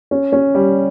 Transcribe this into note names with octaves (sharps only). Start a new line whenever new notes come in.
C#4
C#4
G3